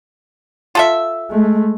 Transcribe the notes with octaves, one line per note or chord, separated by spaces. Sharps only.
F4 A4 E5
G#3 A3